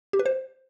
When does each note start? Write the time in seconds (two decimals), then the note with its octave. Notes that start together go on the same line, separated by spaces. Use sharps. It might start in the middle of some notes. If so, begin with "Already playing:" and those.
0.13 G4
0.19 B4
0.26 C5